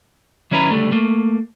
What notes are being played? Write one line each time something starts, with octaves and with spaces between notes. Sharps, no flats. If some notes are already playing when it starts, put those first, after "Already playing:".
D#3 F#3 C#4 E4 B4 A#5
C#2 D3 G3 A3
A3 A#3